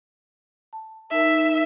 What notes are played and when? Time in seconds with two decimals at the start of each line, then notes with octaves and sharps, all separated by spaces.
0.73 A5
1.11 D#4 A#4 E5